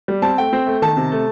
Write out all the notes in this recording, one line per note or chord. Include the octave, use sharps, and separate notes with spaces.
G3
C4 A5
A3 G5
C4
A3
D#3 A5
C3
A3